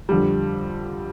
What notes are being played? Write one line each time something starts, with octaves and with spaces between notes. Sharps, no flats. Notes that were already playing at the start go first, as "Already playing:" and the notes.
F2 D3 G3